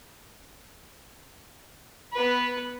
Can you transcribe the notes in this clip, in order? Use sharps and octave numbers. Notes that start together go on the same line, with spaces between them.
B3 B4